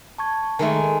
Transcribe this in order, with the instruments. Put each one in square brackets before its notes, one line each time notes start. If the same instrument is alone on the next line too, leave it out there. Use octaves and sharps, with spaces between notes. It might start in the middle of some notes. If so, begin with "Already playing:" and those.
[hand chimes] A5 C#6 G#6
[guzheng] D#3 G#3 A3 [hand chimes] E5 G#5